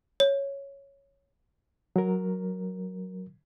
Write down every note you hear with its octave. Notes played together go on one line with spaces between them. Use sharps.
C#5
F#3 A#4